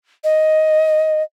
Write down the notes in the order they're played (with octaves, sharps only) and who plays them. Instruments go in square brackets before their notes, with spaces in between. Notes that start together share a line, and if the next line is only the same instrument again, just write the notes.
[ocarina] D#5